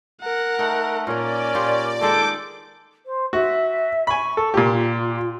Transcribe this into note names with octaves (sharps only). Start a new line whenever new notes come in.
A#4 F#5
A3 D#4
A#2 A#3 C#4 A#4 D5
A#2 F4 G4
D#3 G#3 G#4 A4 D6 G6
C5
F#4 E5
G#5 B5 C#6
A4
A#2 F4 G4